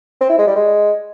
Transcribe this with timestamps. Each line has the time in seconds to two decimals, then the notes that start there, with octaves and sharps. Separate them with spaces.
0.21 C4
0.29 E4
0.38 G#3
0.47 G3
0.56 G#3